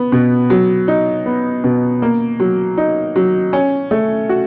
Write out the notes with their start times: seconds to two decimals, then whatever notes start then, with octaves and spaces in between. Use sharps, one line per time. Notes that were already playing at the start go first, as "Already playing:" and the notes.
Already playing: B3
0.12 B2
0.50 F#3
0.88 D#4
1.26 B3
1.64 B2
2.02 A#3
2.40 F#3
2.78 D#4
3.16 F#3
3.53 C#4
3.91 A3
4.29 F#4